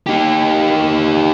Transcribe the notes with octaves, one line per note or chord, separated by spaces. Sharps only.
D#4 G4